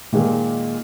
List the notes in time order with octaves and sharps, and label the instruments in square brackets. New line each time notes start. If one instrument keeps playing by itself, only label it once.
[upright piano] A#2 D#3 G#3 A#3